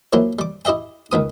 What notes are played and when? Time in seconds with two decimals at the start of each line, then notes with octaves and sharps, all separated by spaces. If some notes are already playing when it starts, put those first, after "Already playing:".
0.13 F3 F#3 A#3 E4 G4
0.39 G3 D6
0.65 E4 G4 D#5 E5 G5
1.12 C#2 D#3 B3 D#6